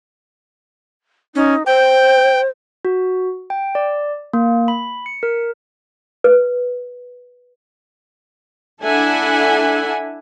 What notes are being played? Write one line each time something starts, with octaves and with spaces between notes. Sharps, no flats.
C#4 D#4
C5 G5
F#4
G5
D5
A#3
B5
C#7
A#4
B4
D4 E4 A4 E5 F#5 G#5